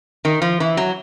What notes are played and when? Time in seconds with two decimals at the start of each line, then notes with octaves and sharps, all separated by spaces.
0.25 D#3
0.42 F3
0.60 E3
0.77 F#3